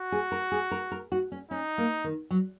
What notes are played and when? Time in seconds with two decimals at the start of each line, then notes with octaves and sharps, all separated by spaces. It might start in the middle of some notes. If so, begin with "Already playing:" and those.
Already playing: F#4
0.12 G#4
0.32 A#4
0.52 G#4
0.71 A#4
0.92 A#4
1.12 F#4
1.32 C#4
1.51 C#4 D#4
1.78 A#3
2.04 D#3
2.31 F#3